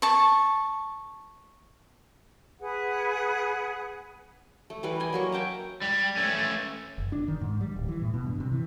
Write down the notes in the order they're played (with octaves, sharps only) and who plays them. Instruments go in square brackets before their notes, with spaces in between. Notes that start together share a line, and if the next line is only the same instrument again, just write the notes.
[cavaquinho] A5 C#6
[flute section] G#4 B4 F#5
[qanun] A3
E3 G3 B4
D#5 G#5
F#3 A#3 C#6
E5 G5 A5 A#5
[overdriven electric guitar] G3
A3 C#4
[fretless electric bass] F#1
D4
D#3
G#2
G3
D1
E3
A2
B2
G2
C3
E3